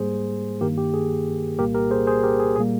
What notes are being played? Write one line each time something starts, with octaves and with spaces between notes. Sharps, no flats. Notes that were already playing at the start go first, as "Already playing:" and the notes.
Already playing: G#2 G3 A#3 G#4 C5
G2 D#3 A#3 G4 A#4
G4
G#4
C2 A#2 G3 A#3 G4 A#4
G4 A#4
G#4 C5
G#4 C5
G4 A#4
G#4
A#2 G3 A#3 G#4